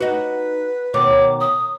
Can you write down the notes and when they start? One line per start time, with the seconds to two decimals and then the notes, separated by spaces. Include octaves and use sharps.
0.01 D#4 F#4 B4
0.94 B2 D#3 C#5 D6
1.41 D#6